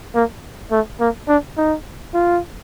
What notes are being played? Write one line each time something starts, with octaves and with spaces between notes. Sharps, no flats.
A#3
A3
A#3
D4
D#4
F4